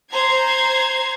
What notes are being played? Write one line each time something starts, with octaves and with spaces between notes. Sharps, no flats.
C5 A#5 G#6 C7